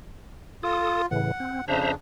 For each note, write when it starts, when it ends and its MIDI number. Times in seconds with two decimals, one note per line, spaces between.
0.63 1.06 65
0.63 1.02 69
0.63 1.02 87
1.11 1.31 45
1.11 1.31 49
1.11 1.31 52
1.11 1.65 78
1.40 1.61 60
1.68 1.94 41
1.68 1.94 49
1.68 1.94 62
1.68 1.92 72
1.68 1.92 76
1.68 1.92 82